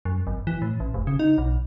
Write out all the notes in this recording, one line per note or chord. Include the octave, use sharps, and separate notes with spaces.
F#2
G#1
E3
A2
A1
F1
C#3
D#4
B1